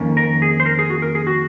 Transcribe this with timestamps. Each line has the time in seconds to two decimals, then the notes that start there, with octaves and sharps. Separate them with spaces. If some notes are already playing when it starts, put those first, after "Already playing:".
Already playing: F2 D#3 A#3 C#4
0.17 A#4
0.42 G#4
0.60 C5
0.66 A#4
0.79 G#4
0.90 F#4
1.02 A#4
1.15 G#4
1.27 F#4